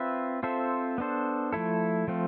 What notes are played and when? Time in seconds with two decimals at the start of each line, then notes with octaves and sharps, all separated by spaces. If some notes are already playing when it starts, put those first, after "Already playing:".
Already playing: C4 F4 B4 E5
0.43 C4 F4 A4 C5 E5
0.98 B3 D4 A4 C5
1.53 F3 A3 E4 A4
2.08 F3 A3 C4 F4